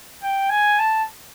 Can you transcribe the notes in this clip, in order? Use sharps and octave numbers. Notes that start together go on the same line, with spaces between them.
G5
G#5
A5